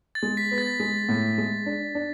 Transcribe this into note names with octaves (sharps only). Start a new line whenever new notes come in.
A6
G#3
B6
B3
A6
G#3
A2
G#3
D4
D4